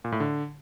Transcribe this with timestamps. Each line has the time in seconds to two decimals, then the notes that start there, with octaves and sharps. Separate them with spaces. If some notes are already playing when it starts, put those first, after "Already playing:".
0.04 A#2
0.12 A2
0.20 D3